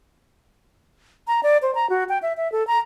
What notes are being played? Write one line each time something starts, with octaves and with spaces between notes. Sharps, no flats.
A#5
D5
C5
A#5
F#4
G5
E5
E5
A4
A#5